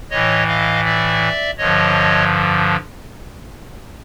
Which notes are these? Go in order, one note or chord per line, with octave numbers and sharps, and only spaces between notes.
A2 E3 C#5 D#5
D#5 F5
D5 E5
G2 D3 F3 C#5 D#5